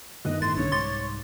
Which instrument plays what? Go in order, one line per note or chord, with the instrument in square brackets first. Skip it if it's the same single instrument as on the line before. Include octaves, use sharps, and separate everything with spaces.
[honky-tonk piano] G1 D#3 F#6 [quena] D#5
[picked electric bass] A2 [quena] C6 [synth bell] A6
[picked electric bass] B1 [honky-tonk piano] D3 C#4 [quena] C#5
[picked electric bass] C2 G#2 [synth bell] C6 A6 [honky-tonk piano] D6